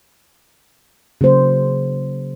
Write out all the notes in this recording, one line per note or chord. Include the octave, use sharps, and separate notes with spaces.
C#3 F#3 A#3 C5